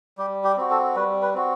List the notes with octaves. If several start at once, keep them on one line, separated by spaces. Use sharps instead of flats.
G3 G4
G4
C4 F#4
A4
G3 B4
B4
C4 F#4